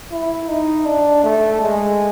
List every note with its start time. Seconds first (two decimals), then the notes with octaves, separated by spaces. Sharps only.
0.12 E4
0.48 D#4
0.85 D4
1.24 A3
1.60 G#3